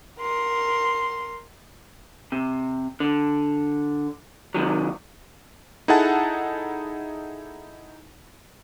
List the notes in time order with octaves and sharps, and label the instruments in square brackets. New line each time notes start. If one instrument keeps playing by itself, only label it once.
[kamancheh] A#4 C6
[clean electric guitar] C3
D3
C3 D#3 F#3
[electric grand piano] D#4 E4 G#4 A4 F#5 A5